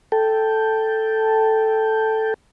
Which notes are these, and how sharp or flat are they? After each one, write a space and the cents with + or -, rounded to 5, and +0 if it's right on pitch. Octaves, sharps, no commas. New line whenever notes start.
A4 +0 G5 +0